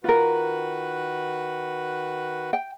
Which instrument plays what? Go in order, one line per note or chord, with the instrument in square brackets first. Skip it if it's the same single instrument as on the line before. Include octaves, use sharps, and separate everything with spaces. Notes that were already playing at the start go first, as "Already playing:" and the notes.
[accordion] D#3 F#4 B4 [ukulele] F4 A#4
[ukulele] G5